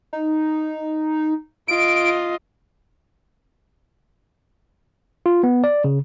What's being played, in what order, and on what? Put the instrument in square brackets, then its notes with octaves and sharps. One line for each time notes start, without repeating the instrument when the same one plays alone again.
[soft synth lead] D#4
[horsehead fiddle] F4 D#5 [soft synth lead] D7
[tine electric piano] F4
B3
D5
C#3